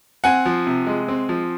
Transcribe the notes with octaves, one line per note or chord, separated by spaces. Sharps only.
C4 F#5 G#5
F3
C3
G#3
C4
F3